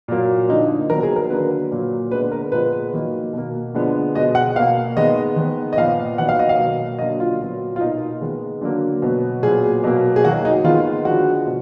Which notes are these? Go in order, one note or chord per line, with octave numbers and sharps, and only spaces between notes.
A#2 F#3 A#3
D3 F3 A#3 D#4
D#3 F#3 B3 A#4
G#4
A#4
D3 F#3 A#3 B4
A#2 F#3 A#3
D3 G#3 B3 B4
A#4
A#2 F3 G#3 B3 B4
D#3 F#3 A#3
B2 A#3
D3 F3 G#3 B3
B2 G#3 B3 D#5
F#5
B2 A#3 F5
D#3 G#3 B3 D#5
D#3 G#3 B3
D#5
A#2 F3 B3 F5
D#3 F#3 B3 F#5
F5
D#5
F5
B2 F#3 A#3
D3 F#3 A#3 D#5
F4
A#2 F#3 B3
F4
B2 A#3 D#4
D#3 G#3 B3
D3 F#3 A#3
B2 F#3 B3
A#2 F#3 B3 G#4
B2 F#3 A#3
G#4
D#3 F#3 A#3 F#4
D#4
D#3 G#3 B3 F4
D3 F3 G#3 F#4
B2